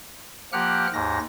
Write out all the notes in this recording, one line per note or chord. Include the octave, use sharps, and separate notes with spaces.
F3 A#3 G4 F#5 F6 F#6
D#2 G#2 A#6